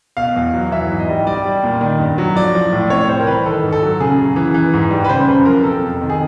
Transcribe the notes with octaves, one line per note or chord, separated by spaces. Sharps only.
B2 F5
E2
F#3
E3 E5
G#2
D#5
G3
G3 D5
G3
A#2
D#3
G2
F#3
F3 D5
F3
A2
C3 C#5
G3 C5
A#4
E3 B4
D#3 A4
G#2
A4
F#3
C#3 G#4
F#2
E3
E3
G#2
G3
B4
C#3 C5
F#2 B4
F3 A#4
C3 A4
F2
D#3
G#4